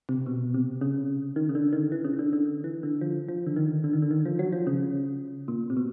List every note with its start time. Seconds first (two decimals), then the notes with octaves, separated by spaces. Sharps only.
0.09 C3
0.26 B2
0.54 C3
0.81 C#3
1.36 D#3
1.49 C#3
1.55 D3
1.73 D#3
1.92 E3
2.05 C#3
2.19 D3
2.33 D3
2.64 E3
2.83 D3
3.01 F3
3.28 F3
3.47 D3
3.56 D#3
3.84 D3
3.93 D#3
4.02 D3
4.11 D#3
4.26 F3
4.39 F#3
4.53 F3
4.67 C#3
5.48 A#2
5.70 C3
5.77 B2